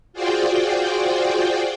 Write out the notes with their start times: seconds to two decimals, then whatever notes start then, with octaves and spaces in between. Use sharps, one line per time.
0.13 F4 F#4 G#4 C5 D5 G5